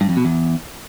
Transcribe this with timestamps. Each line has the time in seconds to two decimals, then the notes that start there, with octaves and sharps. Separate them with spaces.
0.01 G2
0.09 F2
0.17 B2
0.25 E2